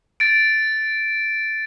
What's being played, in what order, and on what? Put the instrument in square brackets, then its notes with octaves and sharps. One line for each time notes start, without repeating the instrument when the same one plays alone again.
[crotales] A6 D7